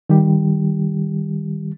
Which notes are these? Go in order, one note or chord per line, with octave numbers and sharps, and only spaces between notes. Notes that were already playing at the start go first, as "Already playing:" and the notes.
D#3 G3 G4